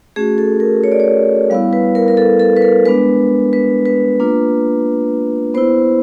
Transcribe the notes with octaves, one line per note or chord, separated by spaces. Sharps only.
A3 C#4 F#4 G#4
A4
A#4
C#5
D5
C#5
G3 B3 E4 F5
B4
A#4
A#4
A4
A4
B4
A#4
G#3 B3 D4 B4
B4
B4
A#3 D4 F4
B3 E4 C5